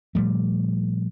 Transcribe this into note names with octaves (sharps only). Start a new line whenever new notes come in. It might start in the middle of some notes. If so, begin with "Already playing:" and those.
A#2 F3 G3 A3